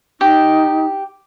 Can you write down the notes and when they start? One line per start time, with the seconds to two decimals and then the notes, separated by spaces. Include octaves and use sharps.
0.21 D#4 G4